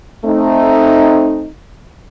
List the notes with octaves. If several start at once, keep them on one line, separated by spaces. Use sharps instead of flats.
A3 C4 D#4